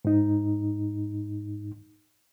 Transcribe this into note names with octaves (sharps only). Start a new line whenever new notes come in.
G#2 D#4